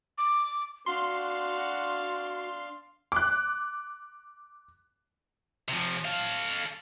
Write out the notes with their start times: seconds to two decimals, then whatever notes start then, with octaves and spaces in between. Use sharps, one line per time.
0.18 D6
0.86 D4 F#4 F5 C6
3.12 D6 F#6
5.69 C3 F3
6.05 A4 F5